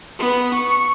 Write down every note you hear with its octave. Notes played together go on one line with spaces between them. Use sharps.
B3
C#6